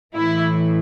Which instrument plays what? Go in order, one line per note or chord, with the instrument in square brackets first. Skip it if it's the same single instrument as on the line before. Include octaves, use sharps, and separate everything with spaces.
[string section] A2 E3 E4